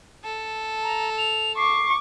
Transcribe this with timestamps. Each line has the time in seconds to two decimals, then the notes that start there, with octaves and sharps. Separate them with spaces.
0.24 A4
0.83 A#5
1.18 F7
1.57 C#6 D6 C7